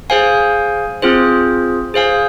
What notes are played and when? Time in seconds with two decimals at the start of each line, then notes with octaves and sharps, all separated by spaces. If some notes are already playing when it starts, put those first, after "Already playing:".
0.10 G#4 C5 F5 G#5
1.02 C4 F4 G#4 C5
1.94 G#4 C5 F5 G#5